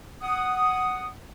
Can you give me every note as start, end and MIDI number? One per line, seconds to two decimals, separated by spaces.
0.22 1.07 78
0.22 1.07 87